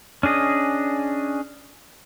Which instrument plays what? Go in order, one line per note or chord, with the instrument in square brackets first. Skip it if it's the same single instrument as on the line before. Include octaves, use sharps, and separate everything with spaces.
[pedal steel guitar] C#4 D4 G#4 D#5